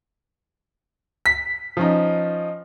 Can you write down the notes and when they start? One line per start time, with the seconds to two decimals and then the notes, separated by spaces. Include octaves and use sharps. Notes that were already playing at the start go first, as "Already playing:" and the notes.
1.26 B6
1.77 F3 C#4 D#4